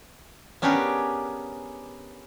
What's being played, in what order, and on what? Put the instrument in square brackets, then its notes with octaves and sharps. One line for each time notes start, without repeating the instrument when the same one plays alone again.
[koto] B3 C#4 D4 G4 G#4 A#4